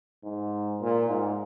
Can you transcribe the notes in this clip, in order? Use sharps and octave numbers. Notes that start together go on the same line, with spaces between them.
G#2
A#2
G#2